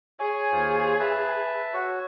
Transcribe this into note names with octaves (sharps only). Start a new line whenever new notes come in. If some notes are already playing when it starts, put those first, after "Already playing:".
G#4 C#5 G#5
D#2 F4 C5
B4 E5 A5
F#4 C#5